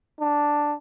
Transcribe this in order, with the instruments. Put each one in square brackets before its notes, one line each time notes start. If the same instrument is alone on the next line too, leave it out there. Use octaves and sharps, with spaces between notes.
[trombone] D4